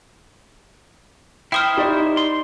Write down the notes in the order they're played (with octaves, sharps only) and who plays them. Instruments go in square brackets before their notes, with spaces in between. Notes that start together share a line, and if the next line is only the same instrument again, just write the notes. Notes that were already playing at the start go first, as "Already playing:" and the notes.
[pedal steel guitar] E4 C5 [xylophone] G5 D#6 F6
[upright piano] D#4 D5 [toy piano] G4
[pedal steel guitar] C6